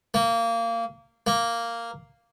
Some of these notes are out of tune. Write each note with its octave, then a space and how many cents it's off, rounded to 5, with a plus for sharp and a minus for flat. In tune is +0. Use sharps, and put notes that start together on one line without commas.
A#3 -20
A#3 -5